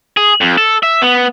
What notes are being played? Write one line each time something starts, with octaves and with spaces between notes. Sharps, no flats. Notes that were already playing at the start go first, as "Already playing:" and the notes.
G#4
F2
A4
E5
B3